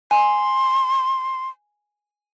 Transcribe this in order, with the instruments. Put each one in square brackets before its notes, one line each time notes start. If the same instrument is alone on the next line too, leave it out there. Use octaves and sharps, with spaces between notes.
[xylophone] G#5 [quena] C6